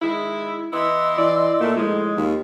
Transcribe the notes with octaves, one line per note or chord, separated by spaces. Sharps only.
D#3 G#3 E4
E3 B3 E4 D#5 C6 E6
E3 D5
A#2 A3 A#3
A2 D#3 F3 G#3
D#2 F4